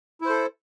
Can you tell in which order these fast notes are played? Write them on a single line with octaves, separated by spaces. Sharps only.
E4 C5 A4